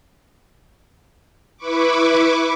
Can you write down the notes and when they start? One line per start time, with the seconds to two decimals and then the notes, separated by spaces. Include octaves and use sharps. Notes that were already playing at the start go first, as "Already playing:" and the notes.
1.57 E4 B4 B5 C#6 D6